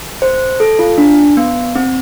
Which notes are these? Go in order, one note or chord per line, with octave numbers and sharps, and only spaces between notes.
C5
A4
F4
D4
B3
C4